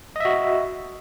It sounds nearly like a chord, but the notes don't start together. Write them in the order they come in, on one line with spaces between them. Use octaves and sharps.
D#5 E5 F#4